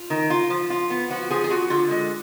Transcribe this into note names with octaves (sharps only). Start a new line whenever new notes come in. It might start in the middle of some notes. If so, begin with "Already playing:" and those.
Already playing: F4
D#3
F4
F3
F4
B3
F3 F#4
F3 G#4
G#4
F4 F#4
D3 F4
G#3